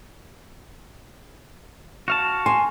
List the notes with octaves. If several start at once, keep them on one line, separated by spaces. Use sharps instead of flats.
F#4 F5 A5
G#5 C6